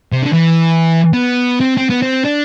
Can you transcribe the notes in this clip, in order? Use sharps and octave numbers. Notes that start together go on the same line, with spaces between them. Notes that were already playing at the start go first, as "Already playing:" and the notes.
C3
D3
E3
B3
C4
C4
B3
C4
D4